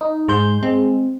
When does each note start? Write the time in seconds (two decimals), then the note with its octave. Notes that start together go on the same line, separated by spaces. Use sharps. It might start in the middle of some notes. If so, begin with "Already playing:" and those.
0.01 D#4
0.28 G#2 G#3 C5 G6
0.63 G#3 C4